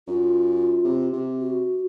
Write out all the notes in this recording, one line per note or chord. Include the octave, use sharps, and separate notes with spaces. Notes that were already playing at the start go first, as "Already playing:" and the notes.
F#2 F4
C3
C3
F#4